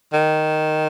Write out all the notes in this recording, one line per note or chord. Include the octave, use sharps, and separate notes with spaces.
D#3